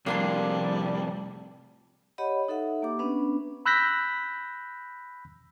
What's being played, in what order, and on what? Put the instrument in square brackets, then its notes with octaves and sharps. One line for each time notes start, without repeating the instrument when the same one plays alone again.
[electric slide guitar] F2 A2 C3 [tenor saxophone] G3 [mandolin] A#3 D4 C6
[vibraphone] G4 C#5 D#5 F#5 B5
D#4 A4 E5 F#5
A#3 G4 D6
B3 C#4 D4 B4
[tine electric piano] B5 E6 F#6 G6 A#6 B6